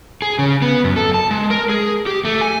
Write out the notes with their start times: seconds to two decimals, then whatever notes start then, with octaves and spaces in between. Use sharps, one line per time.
0.22 G#4
0.39 C#3
0.62 B3
0.84 F#2
0.96 A4
1.14 A5
1.31 G#3
1.51 A#4
1.69 G#4
2.06 G4
2.25 A3
2.41 G#5